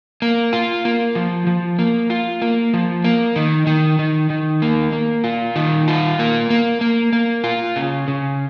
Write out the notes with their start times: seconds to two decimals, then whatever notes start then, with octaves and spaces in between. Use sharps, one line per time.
0.22 A#3
0.53 F4
0.85 A#3
1.15 F3
1.47 F3
1.79 A#3
2.10 F4
2.42 A#3
2.74 F3
3.04 A#3
3.36 D#3
3.67 D#3
3.99 D#3
4.30 D#3
4.62 A#3
4.93 A#3
5.24 F4
5.56 D#3
5.88 F4
6.19 A#3
6.50 A#3
6.81 A#3
7.13 A#3
7.44 F4
7.76 C#3
8.08 C#3